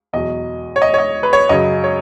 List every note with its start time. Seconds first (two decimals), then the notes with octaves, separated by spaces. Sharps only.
0.13 E2 B2 F#3 D#5
0.76 C#5
0.82 D#5
0.94 C#5
0.98 D#5
1.23 B4
1.33 C#5
1.49 F#2 C#3 F#3 D#5
1.84 C#5